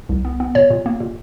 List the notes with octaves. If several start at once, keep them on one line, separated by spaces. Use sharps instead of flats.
C2
B3
B3
A#2 C#5
A#2
A#3
A#2